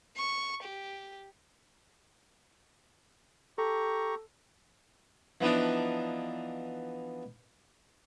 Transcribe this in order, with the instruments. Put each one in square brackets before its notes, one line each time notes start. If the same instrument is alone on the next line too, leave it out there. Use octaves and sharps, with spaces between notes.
[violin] C#6
G4
[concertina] G4 A#5 C#6 [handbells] A4
[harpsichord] E3 F3 B3 D4 D#4